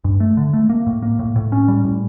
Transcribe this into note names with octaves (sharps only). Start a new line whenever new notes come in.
G2
A3
D3
A3
A#3
A2
A#3
A2
A2
C#4
G3
A2